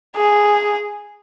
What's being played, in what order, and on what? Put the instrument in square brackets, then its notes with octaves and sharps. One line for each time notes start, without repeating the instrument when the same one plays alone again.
[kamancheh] G#4